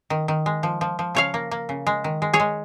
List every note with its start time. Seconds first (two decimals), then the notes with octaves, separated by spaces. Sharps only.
0.10 D#3
0.28 D#3
0.46 G#3
0.63 F3
0.81 F3
0.99 F3
1.15 C#3 C#5 F5
1.34 A#3
1.51 A#3
1.69 C#3
1.87 G#3
2.04 D#3
2.22 G#3
2.33 G#4 C#5
2.40 G#3